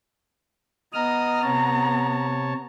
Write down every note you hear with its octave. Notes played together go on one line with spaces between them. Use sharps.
B3 D#5 A#5 D#6 F6
C3 C#5 A5